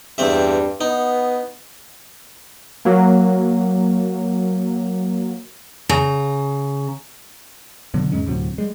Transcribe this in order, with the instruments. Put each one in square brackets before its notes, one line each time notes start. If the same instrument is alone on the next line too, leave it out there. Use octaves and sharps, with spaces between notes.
[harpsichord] E2 C4 E5 [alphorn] G2
[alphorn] B3 [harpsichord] D#4
[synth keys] F#3 A#3
[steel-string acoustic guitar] C#3 A#5
[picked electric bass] B2 D3 F#3 B3
E2 G#2 G#3 C#4
D2 A2 C3 F#3
G3 G#3